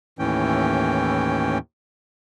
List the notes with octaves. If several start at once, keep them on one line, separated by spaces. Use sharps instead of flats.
D#2 A2 E3 C#4 G5